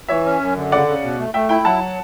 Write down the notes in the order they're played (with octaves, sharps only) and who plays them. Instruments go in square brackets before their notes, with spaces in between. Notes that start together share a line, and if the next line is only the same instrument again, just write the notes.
[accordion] E3 [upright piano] C#5 E5
[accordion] C#4
F#2
D3
[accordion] C#3 [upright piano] D5 F#5
[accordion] C#3
B2
A3
[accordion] A3 [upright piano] E5 G5
[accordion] E4 [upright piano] G5 B5
[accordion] F#3 [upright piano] F#5 A5